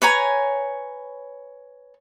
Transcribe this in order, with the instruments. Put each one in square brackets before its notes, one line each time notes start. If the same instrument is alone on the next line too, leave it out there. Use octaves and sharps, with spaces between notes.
[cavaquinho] B4 C#5 G#5 A#5